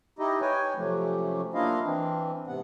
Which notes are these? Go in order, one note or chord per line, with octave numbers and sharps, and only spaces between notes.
D#4 E4 G4 D#5
B4 C#5 G5 G#5
C3 F3 F#3 A3 C#4 G4
A#3 D4 E4 F4 D#5 F5
E3 C4 D4
G#2 C3 B3 F#5